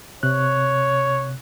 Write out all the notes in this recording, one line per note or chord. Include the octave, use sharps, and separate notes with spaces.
C3 C#5 F#6